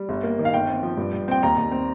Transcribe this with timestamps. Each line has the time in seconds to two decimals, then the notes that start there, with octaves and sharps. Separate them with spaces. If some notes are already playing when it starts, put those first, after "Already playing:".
Already playing: G3
0.09 G1
0.23 A#3
0.39 D#3
0.45 F5
0.54 G1 G5
0.68 C4
0.83 F3
0.97 G2
1.13 G2
1.28 C4 G5
1.43 D#2 A#5
1.58 D#2
1.72 C4